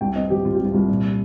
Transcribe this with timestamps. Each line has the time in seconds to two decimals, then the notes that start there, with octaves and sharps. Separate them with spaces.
0.01 C2 G5
0.16 C4 D#5
0.30 F3 G4
0.45 C3 F4
0.55 C2 G4
0.65 F4
0.74 C2
0.88 A#2